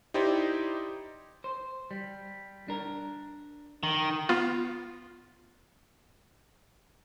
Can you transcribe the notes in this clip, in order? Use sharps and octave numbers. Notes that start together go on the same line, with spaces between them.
D#4 E4 G4 C5 D5 D#5
C5
G3
D4 A#4
D#3
B3 F4